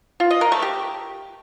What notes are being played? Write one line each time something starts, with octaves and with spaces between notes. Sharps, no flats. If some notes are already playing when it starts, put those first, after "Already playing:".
F4
D#5
A#4
A3
G4